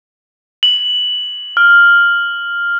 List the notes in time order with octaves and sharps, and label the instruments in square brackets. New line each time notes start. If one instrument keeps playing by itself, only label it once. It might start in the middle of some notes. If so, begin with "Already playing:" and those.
[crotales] F#7
F6